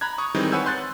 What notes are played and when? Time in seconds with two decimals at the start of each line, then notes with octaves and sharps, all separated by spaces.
0.01 A#5 B5 F#6 G#6
0.18 C#6 D#6
0.35 D#3 E3 G3 G#3 C4 D#4
0.52 B4 C#5 F#5 G#5 E6 G6
0.66 C6 F#6 A6